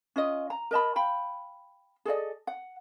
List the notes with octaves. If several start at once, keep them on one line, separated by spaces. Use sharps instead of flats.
C#4 F4 D#5
A#5
A#4 D#5 A5 B5
F5 G5 B5
G#4 A4 D5 D#5
F#5